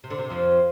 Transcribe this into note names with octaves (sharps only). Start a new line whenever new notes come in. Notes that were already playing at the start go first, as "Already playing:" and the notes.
C3
D3
C3
F2 F3